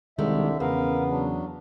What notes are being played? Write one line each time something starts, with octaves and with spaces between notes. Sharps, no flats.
C2 D3 D#3 G#3 E5
E2 C#3 B3 A#4 F5
F#3 D4